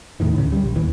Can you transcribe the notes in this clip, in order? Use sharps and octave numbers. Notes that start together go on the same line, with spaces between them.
E2 A2 D#3 E3
D2 C#3
G3
A#1
D#2 E3